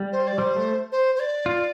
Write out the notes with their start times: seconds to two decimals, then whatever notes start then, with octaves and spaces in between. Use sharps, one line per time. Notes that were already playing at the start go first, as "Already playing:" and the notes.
Already playing: G3
0.12 C5
0.28 D5
0.38 G3 C5
0.56 A3
0.92 C5
1.15 C5
1.20 D5
1.46 F4